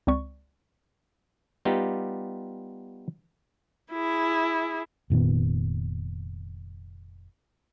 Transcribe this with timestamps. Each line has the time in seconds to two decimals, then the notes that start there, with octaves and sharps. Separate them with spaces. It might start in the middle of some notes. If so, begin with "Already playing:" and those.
0.07 C#2 C4 D5 C#6
1.65 G3 B3 D#4 F4 G4
3.92 E4 G#4
5.10 F1 A#2 D#3 B3